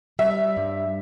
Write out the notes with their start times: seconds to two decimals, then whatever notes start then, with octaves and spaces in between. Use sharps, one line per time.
0.19 G3 E5
0.57 G2